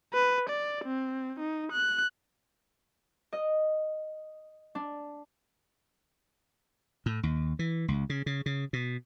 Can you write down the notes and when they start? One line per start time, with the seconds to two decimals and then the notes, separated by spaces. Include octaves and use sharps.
0.14 B4
0.49 D5
0.85 C4
1.39 D#4
1.72 F#6
3.33 D#5
4.75 D4
7.06 A2
7.23 D#2
7.59 E3
7.88 C#2
8.10 C#3
8.26 C#3
8.46 C#3
8.73 B2